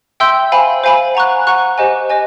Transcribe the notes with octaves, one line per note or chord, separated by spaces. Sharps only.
E5 G5 C6 E6 G6
C5 F5 G#5 B5
C5 F5 G#5 B5
F#5 A#5 C#6 F#6
F#5 A#5 C#6 F#6
G4 C5 D#5 G#5
C5 D#5 G#5